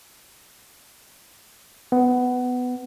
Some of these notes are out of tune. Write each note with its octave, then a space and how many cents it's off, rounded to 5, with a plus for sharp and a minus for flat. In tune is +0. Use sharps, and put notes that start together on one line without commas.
B3 +15